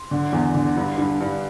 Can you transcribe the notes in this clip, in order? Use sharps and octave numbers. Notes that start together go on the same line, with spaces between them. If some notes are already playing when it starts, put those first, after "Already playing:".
Already playing: C6
D3
E2
D3
G2
G2
G2